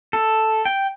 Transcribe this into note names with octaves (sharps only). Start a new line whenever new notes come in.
A4
G5